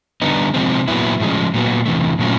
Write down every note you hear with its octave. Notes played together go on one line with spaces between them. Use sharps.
D3 G3 B3 D#4
C3 F3 G#3 C4
A#2 F#3 B3 E4
A2 F3 G#3 C#4
A#2 F#3 B3
E2 C3 E3 A3
A#2 F#3 A3 C#4 F4